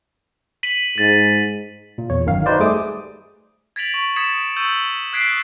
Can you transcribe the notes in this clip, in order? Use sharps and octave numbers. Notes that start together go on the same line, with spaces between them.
B6 D#7 F#7
G#2 A6 D#7
A#2
E2 C#5
G1 F#2 D#3 F5
D#4 F#4 B4 C5 D5
G3 A3 G#4 D6 D#6
G#6 A6 B6 D7 F7 F#7
C#6 D7
D#6 G#6 A6 B6 C#7 E7
C#6 E6 G6 A6 D#7 F#7
D#6 F#6 G#6 B6 C7 D7